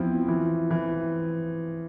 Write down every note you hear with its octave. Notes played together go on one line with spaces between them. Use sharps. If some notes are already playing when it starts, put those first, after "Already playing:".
Already playing: E2 F3 C4 E4
E3
E3